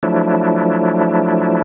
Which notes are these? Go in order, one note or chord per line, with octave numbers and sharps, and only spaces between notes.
F3 F#3 A3 D4 E4